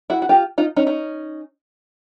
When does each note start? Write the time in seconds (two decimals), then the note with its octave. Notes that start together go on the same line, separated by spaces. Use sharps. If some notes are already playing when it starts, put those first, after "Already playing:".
0.10 E4 F#4
0.22 F#4
0.29 F4 G4
0.58 D#4 F4
0.76 C#4 D#4
0.86 C#4 D#4